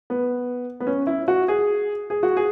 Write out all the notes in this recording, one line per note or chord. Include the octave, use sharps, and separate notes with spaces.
B3
B3
C#4
E4
F#4
G#4
G#4
F#4
G#4